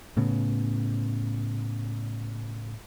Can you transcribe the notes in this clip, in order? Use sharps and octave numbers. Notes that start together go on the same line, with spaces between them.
A2 C#3 B3